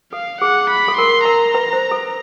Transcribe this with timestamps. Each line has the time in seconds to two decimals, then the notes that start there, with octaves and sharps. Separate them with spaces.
0.13 A4 F5
0.41 G#4 F#5
0.70 B5
0.88 A4
0.97 A#4 C6
1.25 A#4 A#5
1.55 B4
1.73 C5
1.91 A4